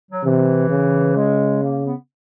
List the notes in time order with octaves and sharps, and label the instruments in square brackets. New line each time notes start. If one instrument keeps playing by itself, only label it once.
[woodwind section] F#3
[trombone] C3 [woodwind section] E3
[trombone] C#3
[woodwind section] G#3
A#3
B3